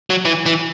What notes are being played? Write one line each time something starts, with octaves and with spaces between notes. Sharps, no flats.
F#3
E3
E3